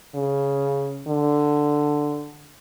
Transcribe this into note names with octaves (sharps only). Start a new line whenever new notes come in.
C#3
D3